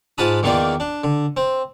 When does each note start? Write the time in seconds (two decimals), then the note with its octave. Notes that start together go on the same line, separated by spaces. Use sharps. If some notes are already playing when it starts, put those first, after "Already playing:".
0.18 G#2 F4 F#5 A5 B5 D#6
0.43 E2 D#3 A#3 D#4 F4 D5
0.80 D4
1.04 D3
1.37 C4